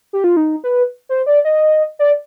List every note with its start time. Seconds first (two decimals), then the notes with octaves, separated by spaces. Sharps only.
0.13 G4
0.24 F4
0.37 D#4
0.64 B4
1.09 C5
1.26 D5
1.45 D#5
1.99 D5